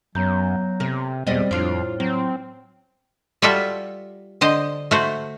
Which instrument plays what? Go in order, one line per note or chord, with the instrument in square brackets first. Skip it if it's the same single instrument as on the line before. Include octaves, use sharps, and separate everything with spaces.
[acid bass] F#2 [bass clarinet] F#3 [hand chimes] B3 A#5 G6
[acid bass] C3 [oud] A#4
[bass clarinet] E2 [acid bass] B2 [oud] G3 D5 D#5 [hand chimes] C4 C5
[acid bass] F2 [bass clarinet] A2 [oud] D4 F4 [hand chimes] C5 F6
[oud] F#3 [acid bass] C4
[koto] G3 F4 F#4 A4 E5
D3 C5 D#5
A3 F#4 C5